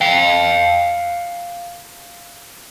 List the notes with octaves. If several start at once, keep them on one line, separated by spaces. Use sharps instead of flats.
F5 G5